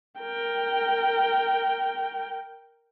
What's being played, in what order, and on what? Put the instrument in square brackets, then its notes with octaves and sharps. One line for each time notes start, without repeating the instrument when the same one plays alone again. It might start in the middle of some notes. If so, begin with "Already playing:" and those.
[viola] A#4 G5